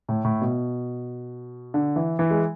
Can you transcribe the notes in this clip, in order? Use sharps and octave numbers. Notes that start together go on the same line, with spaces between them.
A2
A2
B2
D3
E3
E3
G#3